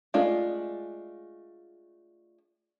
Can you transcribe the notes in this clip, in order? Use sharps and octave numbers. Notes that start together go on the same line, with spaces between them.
G#3 A3 D4 F4